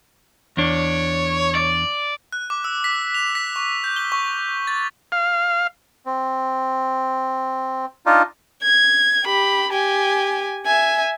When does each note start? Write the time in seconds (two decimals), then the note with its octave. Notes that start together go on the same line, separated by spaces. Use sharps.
0.57 E2 D4 C#5
1.55 D5
2.32 F#6
2.50 D6
2.64 E6
2.84 B6
3.15 F7
3.35 B6
3.56 C#6
3.84 G6
3.96 G7
4.12 C#6
4.67 A6
5.12 F5
6.06 C4
8.06 D4 D#4 F4
8.62 G#6
9.24 G4 B5
9.71 G4 G#5
10.66 E5 G#5